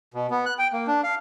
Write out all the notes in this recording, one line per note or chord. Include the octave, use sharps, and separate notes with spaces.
B2
B3
F#6
G5
A#3
D4
F5